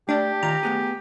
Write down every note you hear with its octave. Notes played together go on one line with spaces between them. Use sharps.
A3 D4 G4 D5
D#3 F4 A#5
A3 B3 G#4